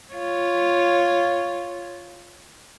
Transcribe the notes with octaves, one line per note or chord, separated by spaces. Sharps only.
F4 C#5